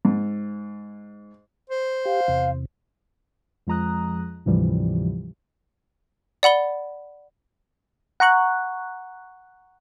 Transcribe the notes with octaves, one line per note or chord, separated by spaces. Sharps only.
G#2
C5
G4 F5
E2 C3
F2 F3 G#3 A#5 D#6 F#6
D2 G#2 C3 E3 F3 G3
D5 F#5 B5 G7
F#5 A#5 C#6 F#6